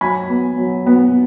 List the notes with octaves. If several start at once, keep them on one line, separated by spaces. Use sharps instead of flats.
F#3 G#5 B5
B3
F#3
B3